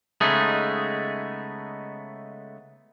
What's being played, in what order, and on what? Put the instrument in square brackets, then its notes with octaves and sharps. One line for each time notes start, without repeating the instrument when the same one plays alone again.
[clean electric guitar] C#3 G#3 A3 B3 D#4 G#4